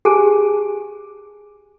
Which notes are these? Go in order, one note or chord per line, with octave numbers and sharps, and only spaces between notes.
G4 G#4 G#5 A5